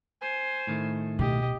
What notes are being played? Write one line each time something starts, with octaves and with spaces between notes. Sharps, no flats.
C5 G#5
A2 D#3 A3
B2 G4 D#5